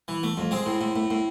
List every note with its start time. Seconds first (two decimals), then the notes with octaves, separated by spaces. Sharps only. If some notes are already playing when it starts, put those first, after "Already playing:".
0.08 E3
0.23 A3
0.37 F2
0.51 G#3 C4
0.66 A2
0.81 A2
0.96 A2
1.10 A2